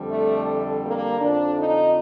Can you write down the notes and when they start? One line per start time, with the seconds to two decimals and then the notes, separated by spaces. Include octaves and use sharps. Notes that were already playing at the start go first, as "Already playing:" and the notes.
Already playing: F2 D3 G3
0.09 A3
0.84 A#3
1.20 F2 D3 F3 D4
1.58 D#4